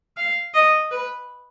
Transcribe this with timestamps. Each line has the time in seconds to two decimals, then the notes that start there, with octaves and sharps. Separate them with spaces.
0.17 F5
0.54 D#5
0.91 B4